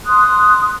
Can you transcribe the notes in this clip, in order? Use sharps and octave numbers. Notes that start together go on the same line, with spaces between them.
C6 D#6 F#6